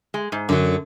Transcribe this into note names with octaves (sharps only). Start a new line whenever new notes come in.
G#3
G#2
F#2 D3 F#3